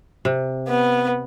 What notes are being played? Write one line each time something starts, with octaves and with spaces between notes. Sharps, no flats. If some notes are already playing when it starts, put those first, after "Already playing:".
C3
B3